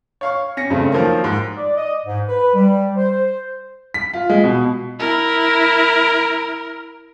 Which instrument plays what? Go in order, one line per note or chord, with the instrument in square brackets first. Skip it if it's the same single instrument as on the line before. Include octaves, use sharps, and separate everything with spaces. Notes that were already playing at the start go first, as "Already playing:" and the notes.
[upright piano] C#5 F5 C#6
C#4 A#6 C#7
G2 C#3 A3 C4
D#3 F3 F#3 A#3
G#2
[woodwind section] D5
D#5
G#2
B4
G3
C5
[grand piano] B6
F4
G#3
B2
[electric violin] E4 A#4